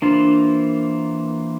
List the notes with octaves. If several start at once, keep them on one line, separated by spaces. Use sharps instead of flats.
E3 A#3 D4 F4 C5